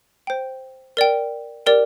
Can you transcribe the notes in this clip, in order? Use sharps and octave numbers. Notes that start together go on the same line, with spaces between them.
C5 G5
A#4 D5 G5
G4 A#4 D5 G5